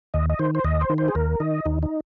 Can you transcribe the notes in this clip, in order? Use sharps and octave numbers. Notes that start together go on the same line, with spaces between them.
D#2 D#5
D#5
D#3 C5
C5
D#2 D#5
C5
D#3
C5
G#4
D#2 A#4
D#3 D#5
D#2 D#4
D#4